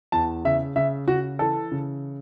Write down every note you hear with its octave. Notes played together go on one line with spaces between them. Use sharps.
E2 A5
C#3 E5
C#3 E5
C#3 F#4
E3 A4
C#3